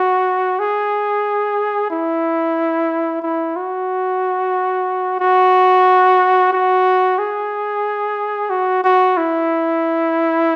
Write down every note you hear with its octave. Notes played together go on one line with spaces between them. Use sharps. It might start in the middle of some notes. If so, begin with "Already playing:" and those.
Already playing: F#4
G#4
E4
E4
F#4
F#4
F#4
G#4
F#4
F#4
E4